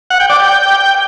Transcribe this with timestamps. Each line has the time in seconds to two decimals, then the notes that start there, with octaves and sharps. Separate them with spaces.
0.10 F#5
0.20 G5
0.30 D5
0.39 G5